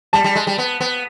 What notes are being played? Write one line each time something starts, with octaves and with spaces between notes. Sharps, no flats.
G3 A5
G3
G#3
G3
B3
B3